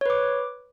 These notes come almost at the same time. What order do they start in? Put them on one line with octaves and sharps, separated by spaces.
C#5 B4 D6